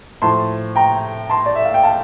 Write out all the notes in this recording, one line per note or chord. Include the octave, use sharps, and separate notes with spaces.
A2 F3 A5 C6
G5 A#5
A5 C6
D5
E5
F5
G5
F5 A5